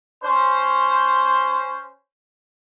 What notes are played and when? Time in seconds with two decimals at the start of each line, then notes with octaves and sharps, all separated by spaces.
0.23 C#4 C5